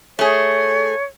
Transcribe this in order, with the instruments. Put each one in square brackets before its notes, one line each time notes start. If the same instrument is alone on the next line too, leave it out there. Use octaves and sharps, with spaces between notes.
[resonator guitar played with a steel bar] A3 G#4 [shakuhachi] C#5